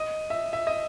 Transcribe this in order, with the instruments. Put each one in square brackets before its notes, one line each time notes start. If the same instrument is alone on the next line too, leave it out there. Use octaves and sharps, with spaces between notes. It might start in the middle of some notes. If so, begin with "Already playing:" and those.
Already playing: [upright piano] D#5
E5
E5
D#5